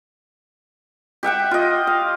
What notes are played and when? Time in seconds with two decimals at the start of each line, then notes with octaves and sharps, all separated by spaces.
1.23 G4 E5 F#5 G5
1.51 F4 D#5
1.87 F5